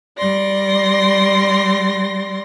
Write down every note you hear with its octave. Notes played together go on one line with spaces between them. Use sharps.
G3 D5 C6 A#6